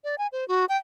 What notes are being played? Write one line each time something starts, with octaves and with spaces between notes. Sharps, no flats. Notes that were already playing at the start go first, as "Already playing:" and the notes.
D5
G#5
C5
F#4
G5